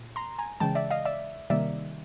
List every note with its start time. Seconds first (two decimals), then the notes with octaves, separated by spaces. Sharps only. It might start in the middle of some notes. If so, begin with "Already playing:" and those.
Already playing: A#2
0.16 A#5 C6
0.39 G#5 A#5
0.60 C#3 E3 G#3 G5 A5
0.75 D5 E5
0.90 D#5 F5
1.05 D5 E5
1.50 C3 D#3 G3 A#3 D5 E5